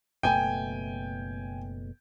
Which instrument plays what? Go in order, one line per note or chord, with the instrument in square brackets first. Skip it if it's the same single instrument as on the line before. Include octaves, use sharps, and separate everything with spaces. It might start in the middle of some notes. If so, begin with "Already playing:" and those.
[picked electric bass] F#1 B2 A3 [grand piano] G5 G#5